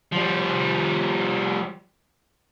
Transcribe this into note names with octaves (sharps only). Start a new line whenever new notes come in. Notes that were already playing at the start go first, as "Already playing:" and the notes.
F3 G3